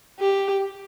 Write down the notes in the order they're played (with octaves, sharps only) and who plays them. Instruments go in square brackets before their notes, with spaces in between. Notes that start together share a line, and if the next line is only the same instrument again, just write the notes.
[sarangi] G4